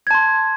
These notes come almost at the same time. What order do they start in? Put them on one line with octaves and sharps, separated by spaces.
G#6 A5 C6